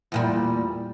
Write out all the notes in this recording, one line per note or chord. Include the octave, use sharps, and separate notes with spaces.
E2 A#2 G3